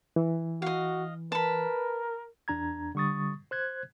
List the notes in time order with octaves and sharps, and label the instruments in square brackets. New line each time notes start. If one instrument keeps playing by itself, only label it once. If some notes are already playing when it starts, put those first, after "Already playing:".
[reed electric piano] E3
[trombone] F#4 [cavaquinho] D#5 F5
[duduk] A#4 [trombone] B4 [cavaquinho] A5 B5
[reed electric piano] E2 D4 A#5 G#6
D3 G3 C#6 D#6 A6
C5 F#6 G#6